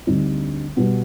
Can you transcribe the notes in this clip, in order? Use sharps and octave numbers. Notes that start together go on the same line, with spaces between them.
D2 D3 G3 C4 D#4
B2 G3 B3